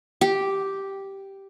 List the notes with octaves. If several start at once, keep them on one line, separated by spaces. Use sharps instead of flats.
G4